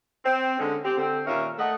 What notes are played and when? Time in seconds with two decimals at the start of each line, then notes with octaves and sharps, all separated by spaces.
0.24 C4
0.59 D3 G#3 C#4
0.85 C4 G4
0.98 D3 C4
1.26 D#2 A#2 C#4 A#4 E5 F5
1.58 A3 D#5 F#5